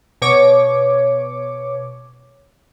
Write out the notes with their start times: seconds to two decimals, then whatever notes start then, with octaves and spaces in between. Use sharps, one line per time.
0.22 B2 C#5 D6